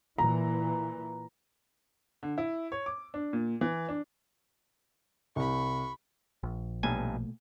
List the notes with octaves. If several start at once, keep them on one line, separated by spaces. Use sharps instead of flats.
A#2 E3 A#5
D3
E4
C#5
D6
D4
A#2
E3
D4
C2 B5 C#6
A#1
B1 G2 B2 A3 A#3 G#5